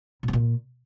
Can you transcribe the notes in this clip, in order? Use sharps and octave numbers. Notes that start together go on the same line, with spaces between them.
A#2
B3
A#2